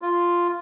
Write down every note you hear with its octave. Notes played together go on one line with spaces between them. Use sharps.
F4